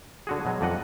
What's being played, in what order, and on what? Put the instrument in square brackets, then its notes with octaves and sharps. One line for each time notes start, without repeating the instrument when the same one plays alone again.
[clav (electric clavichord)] D3 F#4 G#4
B2 F#3 G#3
F2 D#4 D5 D#5 F#5